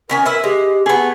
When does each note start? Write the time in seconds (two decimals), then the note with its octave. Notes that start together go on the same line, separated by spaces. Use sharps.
0.10 D#3 C#4 A#4 G#5
0.26 E4 B4 E5
0.44 G#3 G4
0.86 A3 B3 G#4